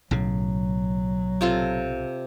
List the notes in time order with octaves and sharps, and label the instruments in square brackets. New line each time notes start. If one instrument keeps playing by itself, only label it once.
[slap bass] B1 A2 C#3 [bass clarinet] F#3
[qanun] C3 F4 A4